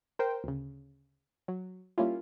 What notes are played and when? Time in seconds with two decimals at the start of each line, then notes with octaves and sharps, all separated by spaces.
0.19 A#4 C5 G5
0.44 D2 C#3
1.48 F#3
1.98 G3 A#3 C#4 E4 F4